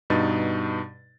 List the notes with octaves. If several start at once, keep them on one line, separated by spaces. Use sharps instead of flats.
G2 B2 D#4 A6